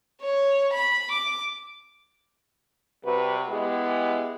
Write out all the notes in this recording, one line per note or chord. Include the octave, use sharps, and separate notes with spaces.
C#5
B5
D6
C3 G3 F#4 B4
G#3 B3 E4 G4